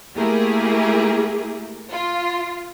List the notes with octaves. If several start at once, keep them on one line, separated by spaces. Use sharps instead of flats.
A3 A#3 E4 G4 G#4 A#4
F4